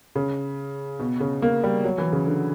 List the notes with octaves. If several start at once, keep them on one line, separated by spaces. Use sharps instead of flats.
C#3
B2
C#3
A#3
G3
F#3
E3
C#3
D3